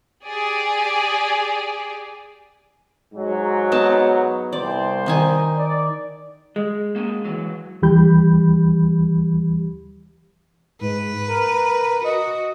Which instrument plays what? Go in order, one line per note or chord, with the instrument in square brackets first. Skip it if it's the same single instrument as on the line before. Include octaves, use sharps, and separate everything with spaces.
[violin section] G4 G#4 D5
[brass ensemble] G#2 F#3
[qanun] B3 D#4 A5
[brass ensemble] C2 C5 [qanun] D5
[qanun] D#3 D#4 G#5
[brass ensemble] D5
[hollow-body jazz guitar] G#3
[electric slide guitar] A#3 C#4 G#4
E3 F#3
[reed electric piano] D#2 E3 G3 G4 B5 G6
[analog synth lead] G#2 [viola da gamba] B4
[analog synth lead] A#4
[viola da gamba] F#4 [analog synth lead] D#5